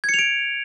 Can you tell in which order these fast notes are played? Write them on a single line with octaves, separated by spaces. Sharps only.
G#6 C#7 F7 D7